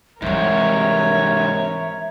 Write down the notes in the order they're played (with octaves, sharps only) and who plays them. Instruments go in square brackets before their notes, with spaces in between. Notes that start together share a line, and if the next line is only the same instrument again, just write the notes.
[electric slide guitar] G#2 C3 [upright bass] E3 G3 [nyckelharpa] A#4 C#5 [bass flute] E5